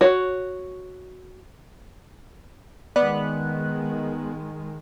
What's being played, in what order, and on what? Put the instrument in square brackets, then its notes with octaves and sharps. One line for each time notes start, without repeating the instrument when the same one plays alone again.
[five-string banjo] F#4 C#5
[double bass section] D#3 G#3 [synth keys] B3 F#6 [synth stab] D5